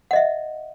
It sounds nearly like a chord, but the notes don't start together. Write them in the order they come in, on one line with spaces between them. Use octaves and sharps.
F#5 D#5 E5